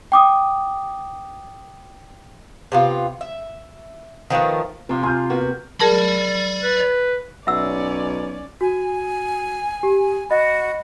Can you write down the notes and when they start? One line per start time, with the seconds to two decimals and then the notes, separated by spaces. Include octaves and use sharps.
0.12 G5 D6 D#6
2.72 C3 B3 F4
3.21 E5
4.30 D#3 F3 A3 B3
4.89 C3 F3 C4 F4
5.03 G#4 C6 F6 G6
5.30 A#3 B3 F#4
5.80 G#4 A#4 D5 A5 B5
6.63 B4
7.47 B1 C#4 D5 E5 F#5 E6
8.61 F#4 G#5
9.83 G4
10.30 F#4 D#5 B5